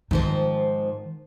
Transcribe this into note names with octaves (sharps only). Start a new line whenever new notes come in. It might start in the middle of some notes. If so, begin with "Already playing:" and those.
G#2 D#3 F3 C4